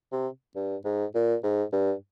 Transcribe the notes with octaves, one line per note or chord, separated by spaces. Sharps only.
C3
G2
G#2
A#2
G#2
G2